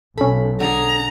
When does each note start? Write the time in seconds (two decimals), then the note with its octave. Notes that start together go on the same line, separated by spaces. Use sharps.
0.18 B1 C#4 A4 B5
0.60 D3 G#4 A#5